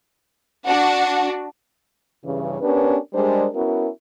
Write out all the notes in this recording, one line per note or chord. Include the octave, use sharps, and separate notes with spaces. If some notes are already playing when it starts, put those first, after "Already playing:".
D4 F#4 F#5
G2 C#3 E3
B3 C#4 D4 G4 A#4 B4
G3 G#3 D4 G#4 A#4 C5
B3 C#4 E4 F#4 A#4